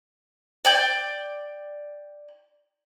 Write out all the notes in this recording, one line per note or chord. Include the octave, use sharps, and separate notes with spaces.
D5 G5 G6